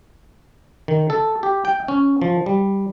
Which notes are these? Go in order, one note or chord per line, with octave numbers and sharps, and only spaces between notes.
D#3
A4
G4
G5
C#4
F3
G3